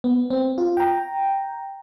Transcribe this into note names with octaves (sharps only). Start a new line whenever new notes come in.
B3
C4
F4
G5 A#5